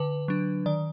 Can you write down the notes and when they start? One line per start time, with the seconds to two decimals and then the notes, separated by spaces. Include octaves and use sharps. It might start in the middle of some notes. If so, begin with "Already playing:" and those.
Already playing: D3 B4
0.28 F#3 D4
0.66 D#3 D5